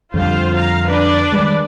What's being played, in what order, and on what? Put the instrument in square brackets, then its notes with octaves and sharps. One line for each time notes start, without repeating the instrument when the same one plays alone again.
[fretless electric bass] F2 D3 G3 [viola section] F4 C5 F5
[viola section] F5 A#5
D4 B4 D5
[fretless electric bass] D#3 G3 G#3